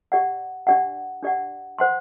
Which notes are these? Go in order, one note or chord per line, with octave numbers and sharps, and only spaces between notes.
G4 D5 F#5
D4 G4 D5 F#5
D4 G4 D5 F#5
C5 F#5 C6